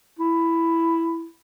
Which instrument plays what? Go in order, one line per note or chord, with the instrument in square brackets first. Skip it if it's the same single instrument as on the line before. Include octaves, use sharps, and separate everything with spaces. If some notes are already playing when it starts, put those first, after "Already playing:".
[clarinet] E4